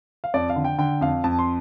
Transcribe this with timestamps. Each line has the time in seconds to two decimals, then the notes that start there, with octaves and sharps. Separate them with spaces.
0.24 F5
0.34 F2 D5
0.50 F5
0.56 D3
0.65 G5
0.78 D3 G5
1.01 F2 F5
1.24 F2 A5
1.39 C6